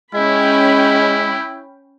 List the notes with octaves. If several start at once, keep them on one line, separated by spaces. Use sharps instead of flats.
G#3 C#4 E4 G5 B5